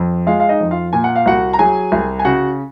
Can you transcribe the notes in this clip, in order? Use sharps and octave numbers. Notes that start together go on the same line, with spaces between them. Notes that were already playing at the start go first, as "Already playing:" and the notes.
Already playing: F2
G#3 F4 F5
F5
D#4 D#5
F2
F4 F5
A#2 G#5
F#5
F5
C2 F#4 F#5
A#5
F#3 G#4 G#5
C2
G#5
C#3 F#4 F#5